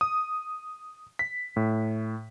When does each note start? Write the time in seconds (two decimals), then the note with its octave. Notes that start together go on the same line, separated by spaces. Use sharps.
0.01 D#6
1.19 B6
1.56 A2